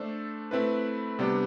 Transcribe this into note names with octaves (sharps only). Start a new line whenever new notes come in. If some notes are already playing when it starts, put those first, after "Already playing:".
Already playing: A3 D4 A4 C5
A3 C4 E4 B4
C3 G3 B3 D4 G4